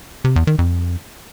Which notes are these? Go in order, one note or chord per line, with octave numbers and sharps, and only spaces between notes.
C3
E2
D#3
F2